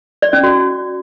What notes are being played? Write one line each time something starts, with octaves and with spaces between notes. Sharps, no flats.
D5
C#4
F#4